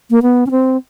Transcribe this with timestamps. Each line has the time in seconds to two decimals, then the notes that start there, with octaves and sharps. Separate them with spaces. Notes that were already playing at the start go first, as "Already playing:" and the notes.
0.10 A#3
0.22 B3
0.47 C#4
0.51 C4